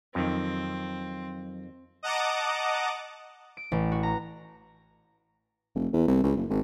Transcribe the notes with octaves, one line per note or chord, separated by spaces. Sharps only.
F2 D#3 F#3 C4
D#5 F#5 A5 A#5 D6 D#6
D7
A1
F#4
A#5
F1
E2
C2
C#2
F#1
G#1